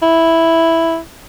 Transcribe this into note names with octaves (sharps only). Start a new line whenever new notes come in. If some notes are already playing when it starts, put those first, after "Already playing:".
E4